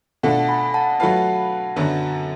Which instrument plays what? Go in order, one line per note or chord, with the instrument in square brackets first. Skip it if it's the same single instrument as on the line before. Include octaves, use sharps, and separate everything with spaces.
[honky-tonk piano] B2 A3 D4 F4 A4 [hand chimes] F#5 A5
[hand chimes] G#5 B5
F#5 A5
[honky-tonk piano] F#3 A3 F4 B4 F5 [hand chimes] F#5 A5
[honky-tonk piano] F#2 D3 F#3 B3 F#4